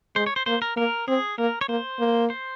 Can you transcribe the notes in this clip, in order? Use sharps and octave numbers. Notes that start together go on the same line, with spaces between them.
G#3 C5
C#5
C5
A#3 C5
A#4
A#3 A#4
C4 G#4
A#3 A#4
C#5
A#3 C5
A#3
C5